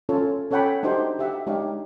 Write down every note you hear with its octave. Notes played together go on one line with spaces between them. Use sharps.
C#4 F4 A4 C#5
C#4 A4 C#5 F#5 G5 B5
D4 D#4 F#4 G4 C5
G4 E5 F#5
G#3 D4 D#4 G4 C#5 F5